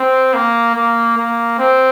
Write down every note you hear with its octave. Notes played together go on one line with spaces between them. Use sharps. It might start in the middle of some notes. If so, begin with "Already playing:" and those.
Already playing: C4
A#3
A#3
A#3
C4